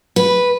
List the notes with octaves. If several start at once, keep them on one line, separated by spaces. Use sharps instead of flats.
B4